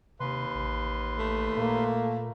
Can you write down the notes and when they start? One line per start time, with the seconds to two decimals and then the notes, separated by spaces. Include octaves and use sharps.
0.20 D#2 C3 B4 C6
0.55 A1
1.19 A3
1.57 A#2 A#3